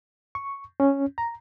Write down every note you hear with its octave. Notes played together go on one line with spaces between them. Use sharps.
C#6
C#4
A#5